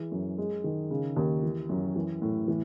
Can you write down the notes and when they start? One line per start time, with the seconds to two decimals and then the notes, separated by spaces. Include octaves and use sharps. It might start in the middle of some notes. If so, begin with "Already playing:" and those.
Already playing: E3 G#3
0.12 F#2
0.38 G#3
0.64 D#3
0.91 C#3
1.16 D#2
1.43 E3
1.69 F#2
1.96 E3
2.22 A2
2.48 E3